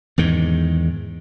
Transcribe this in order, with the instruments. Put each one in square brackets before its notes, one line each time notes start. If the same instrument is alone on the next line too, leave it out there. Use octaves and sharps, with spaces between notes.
[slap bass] E2 G#2 D#3